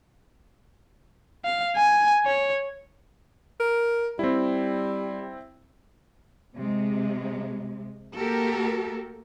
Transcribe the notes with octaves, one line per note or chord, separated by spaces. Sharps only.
F5
G#5
C#5
A#4
G3 C4 E4
C3 G#3
A3 A#3 F#4 G4 A4 A#4